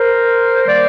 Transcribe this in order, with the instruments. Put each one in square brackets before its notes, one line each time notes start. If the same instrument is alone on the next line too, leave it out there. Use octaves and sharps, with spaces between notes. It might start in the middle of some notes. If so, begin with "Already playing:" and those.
Already playing: [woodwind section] A#4 C5
D#3 G3 A#3 C5 D5